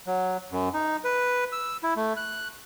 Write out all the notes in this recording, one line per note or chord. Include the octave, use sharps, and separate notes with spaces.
F#3
F#2
D#4
B4
E6
E4
A3
F#6